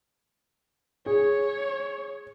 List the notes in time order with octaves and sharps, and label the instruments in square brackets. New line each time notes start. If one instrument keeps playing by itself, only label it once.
[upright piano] G#4 [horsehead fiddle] C#5